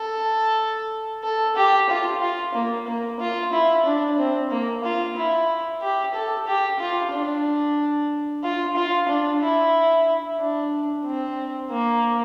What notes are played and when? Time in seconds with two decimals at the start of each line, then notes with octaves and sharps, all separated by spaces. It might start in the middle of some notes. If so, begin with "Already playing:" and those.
Already playing: A4
1.23 A4
1.56 G4
1.90 F4
2.21 F4
2.55 A#3
2.87 A#3
3.20 F4
3.53 E4
3.86 D4
4.18 C4
4.51 A#3
4.84 F4
5.17 E4
5.82 G4
6.14 A4
6.47 G4
6.80 F4
7.13 D4
8.44 F4
8.77 F4
9.08 D4
9.42 E4
10.39 D4
11.05 C4
11.71 A#3